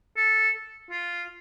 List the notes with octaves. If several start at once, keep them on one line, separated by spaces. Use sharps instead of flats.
A4
F4